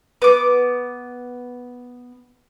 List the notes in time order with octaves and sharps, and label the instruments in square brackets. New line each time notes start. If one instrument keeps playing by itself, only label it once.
[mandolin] B3 D6